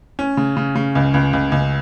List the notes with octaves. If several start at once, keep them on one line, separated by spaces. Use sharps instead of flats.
C#4
C#3
C#3
C#3
C#2
C#2
C#2
C#2